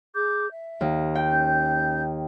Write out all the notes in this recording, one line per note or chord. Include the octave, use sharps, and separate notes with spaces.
G#4 D6 G6
E5
D#2
G5
C#4 G6